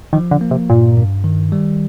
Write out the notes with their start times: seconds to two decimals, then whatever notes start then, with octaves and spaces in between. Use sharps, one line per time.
0.13 D#3 F3
0.31 D3
0.41 A#3
0.51 C3
0.70 G2 A#2
0.97 G2
1.24 D#3
1.52 G3